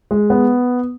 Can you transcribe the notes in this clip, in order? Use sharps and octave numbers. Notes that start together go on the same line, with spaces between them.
G#3
B3